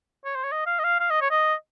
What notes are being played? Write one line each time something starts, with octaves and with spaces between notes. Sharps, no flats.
C#5
C5
C#5
D#5
F5
D#5
F5
F5
D#5
C#5
D#5